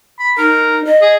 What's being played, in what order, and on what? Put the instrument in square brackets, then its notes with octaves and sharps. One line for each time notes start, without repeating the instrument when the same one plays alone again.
[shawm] B5
[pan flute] D#4 [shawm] A#4
[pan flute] D#5
[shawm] G#4